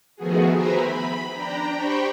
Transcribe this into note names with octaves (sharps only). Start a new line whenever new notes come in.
D#3 F3 A3 B3 F#4 G#4
B4 C5 E5 G5 G#5 A#5
B5
D4 G5 A#5
G4 C5 G5 B5 C#6